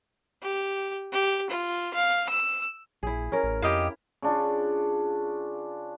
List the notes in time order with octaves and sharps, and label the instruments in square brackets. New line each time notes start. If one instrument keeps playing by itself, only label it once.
[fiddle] G4
G4
F4
F5
E6
[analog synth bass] A#1 [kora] E4 G#4
[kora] C#4 A#4
[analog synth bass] A1
[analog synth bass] F2 [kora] E4 [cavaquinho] G4 D#5 F5
[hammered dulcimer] C#3 D4 F4